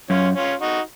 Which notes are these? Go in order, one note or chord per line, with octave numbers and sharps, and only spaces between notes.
F#2 C#4 F4
C#4 F4
D#4 F#4